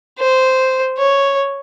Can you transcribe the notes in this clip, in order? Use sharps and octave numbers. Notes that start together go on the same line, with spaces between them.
C5
C#5